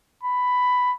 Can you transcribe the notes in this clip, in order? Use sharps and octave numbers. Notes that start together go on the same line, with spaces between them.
B5